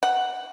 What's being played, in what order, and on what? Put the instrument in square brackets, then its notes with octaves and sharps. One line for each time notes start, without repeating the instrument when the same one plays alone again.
[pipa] F#5